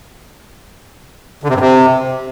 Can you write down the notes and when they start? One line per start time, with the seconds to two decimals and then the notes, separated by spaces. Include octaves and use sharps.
1.43 D3
1.49 C3
1.55 G2
1.60 C3